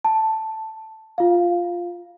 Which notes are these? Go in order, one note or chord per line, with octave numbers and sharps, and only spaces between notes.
A5
F4 F5